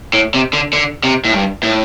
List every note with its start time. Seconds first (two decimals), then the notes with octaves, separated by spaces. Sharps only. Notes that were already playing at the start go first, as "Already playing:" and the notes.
0.13 A2
0.34 C3
0.53 D3
0.73 D3
1.03 C3
1.25 A2
1.34 G2
1.63 A2